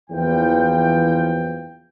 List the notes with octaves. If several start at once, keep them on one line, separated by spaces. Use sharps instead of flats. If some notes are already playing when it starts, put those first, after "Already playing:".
F#1 E2 E3 F3 G5